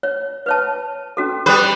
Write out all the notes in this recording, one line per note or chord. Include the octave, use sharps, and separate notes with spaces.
C#5
B4 C#5 A5
C#4 F#4 A4
G3 G4 B4 D#6